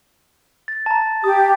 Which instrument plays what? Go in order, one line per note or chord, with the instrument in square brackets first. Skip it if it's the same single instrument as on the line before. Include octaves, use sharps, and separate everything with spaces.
[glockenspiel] A6
A5 A#5
[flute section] G4 [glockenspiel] D#6